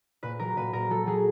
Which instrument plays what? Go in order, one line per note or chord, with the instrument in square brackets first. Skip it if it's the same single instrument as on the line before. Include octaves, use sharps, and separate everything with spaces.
[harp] A#2 B4
F#3 A#4
A#2 B4
A#2 A#4
F#3 A4
F#3 G#4